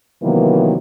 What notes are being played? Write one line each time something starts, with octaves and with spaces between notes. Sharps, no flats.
C3 D#3 E3 F#3 A#3 B3